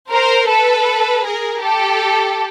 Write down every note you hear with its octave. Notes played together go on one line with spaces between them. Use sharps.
A#4 C5
A4 B4
G#4 A#4
G4 A4